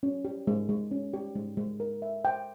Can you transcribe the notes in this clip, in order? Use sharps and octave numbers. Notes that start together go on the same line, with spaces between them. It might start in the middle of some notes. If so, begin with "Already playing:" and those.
C#4
G4
G#3
G#3
C#4
G4
G#3
G#3
A#4
E5
G5